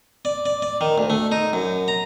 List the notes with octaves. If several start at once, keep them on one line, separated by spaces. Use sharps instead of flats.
D5
D5
D5
D#3
D2
A3
D#4
F#2
A#5